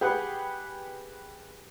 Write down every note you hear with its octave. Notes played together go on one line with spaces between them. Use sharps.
G4 G#4 B4 F#5